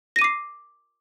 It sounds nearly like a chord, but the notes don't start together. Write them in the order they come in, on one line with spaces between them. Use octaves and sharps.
A#6 D#7 D6 C7